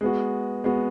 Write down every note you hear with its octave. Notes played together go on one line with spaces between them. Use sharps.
G#3 B3 F#4
G#3 B3 F#4